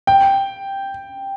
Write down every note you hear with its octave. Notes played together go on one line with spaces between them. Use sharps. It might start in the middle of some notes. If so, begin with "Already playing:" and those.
G5